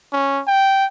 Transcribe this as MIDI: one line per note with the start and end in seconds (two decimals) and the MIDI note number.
0.13 0.41 61
0.47 0.85 79